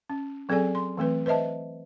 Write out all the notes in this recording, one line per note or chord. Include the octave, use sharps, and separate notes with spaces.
C#4
F#3 C4 G#4 A4 D5 G#5
C6
E3 A3 C4 B4
B4 C5 D#5 E5 A5